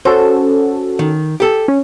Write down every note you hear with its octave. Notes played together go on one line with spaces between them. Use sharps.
C#4 F#4 A4 C5
D#3
G4 A4
C#4